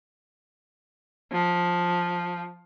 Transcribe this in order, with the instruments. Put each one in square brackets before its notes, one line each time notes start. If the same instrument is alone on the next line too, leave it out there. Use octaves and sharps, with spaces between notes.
[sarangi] F3